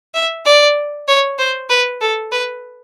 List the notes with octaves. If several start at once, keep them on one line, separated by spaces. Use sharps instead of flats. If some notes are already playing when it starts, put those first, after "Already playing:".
E5
D5
C#5
C5
B4
A4
B4